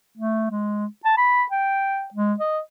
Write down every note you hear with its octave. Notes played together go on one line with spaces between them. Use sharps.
A3
G#3
A5
B5
G5
G#3
D#5